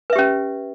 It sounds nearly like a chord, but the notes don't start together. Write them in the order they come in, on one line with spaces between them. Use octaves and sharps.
B4 E5 G4 C#4